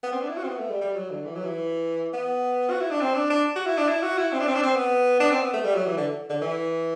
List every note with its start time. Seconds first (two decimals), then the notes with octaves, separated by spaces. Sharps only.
0.03 B3
0.12 C4
0.20 D4
0.29 E4
0.37 F#4
0.43 C4
0.48 B3
0.59 A3
0.70 G3
0.81 G3
0.96 F#3
1.10 D3
1.25 E3
1.35 F#3
1.44 E3
2.13 B3
2.70 F#4
2.81 E4
2.91 D4
3.01 C4
3.15 D4
3.30 D4
3.56 F#4
3.66 E4
3.78 D4
3.89 E4
4.03 F#4
4.18 E4
4.32 C4
4.40 D4
4.47 C4
4.55 D4
4.63 C4
4.76 B3
5.20 D4
5.31 C4
5.42 B3
5.53 A3
5.65 G3
5.75 F#3
5.86 E3
5.97 D3
6.30 D3
6.41 E3